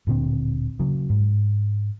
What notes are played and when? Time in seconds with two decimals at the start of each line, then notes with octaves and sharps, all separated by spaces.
0.07 D1 A#2 D3 C4
0.79 C#3 F#3
1.10 G#2